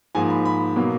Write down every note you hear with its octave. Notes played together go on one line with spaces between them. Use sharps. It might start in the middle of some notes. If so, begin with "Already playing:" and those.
G#2 F3 A#3 G#5
B5
B5
B2 F#3 A#3